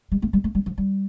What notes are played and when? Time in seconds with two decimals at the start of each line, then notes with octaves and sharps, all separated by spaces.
0.12 G3
0.22 A3
0.33 G3
0.44 A3
0.55 G3
0.66 F3
0.78 G3